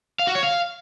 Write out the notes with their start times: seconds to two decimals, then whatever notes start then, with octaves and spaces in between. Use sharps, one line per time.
0.19 F5
0.27 F#4
0.35 C#5
0.43 F5